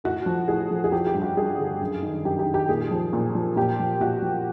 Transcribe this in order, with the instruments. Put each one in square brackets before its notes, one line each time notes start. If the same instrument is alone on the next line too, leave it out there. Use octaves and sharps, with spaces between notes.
[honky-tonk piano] A2 F#4
F3
A2 G#4
F3
G#4
F3 G4
G4
G2
F#4
G2 G#4
D3
F#2
D#3
F#2 G4
G4
D#3
G4
A#2 G#4
F3
A#2
F3
A#2 G4
F3
A#2 F#4
F3